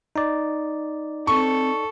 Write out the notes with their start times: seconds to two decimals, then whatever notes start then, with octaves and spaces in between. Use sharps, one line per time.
0.16 D#4 D5
1.27 C4 A4 C#6